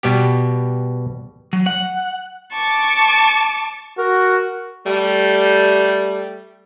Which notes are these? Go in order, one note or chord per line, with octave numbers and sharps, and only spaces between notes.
B2 G3 B3 G4
F#3
F#5
A5 C#6 D6
F#4 A#4
G3 A3